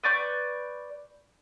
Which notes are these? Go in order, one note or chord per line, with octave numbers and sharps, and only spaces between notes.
B4 D5 C#6 G6